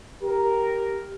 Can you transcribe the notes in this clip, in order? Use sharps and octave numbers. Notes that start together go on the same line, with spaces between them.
G4 A#4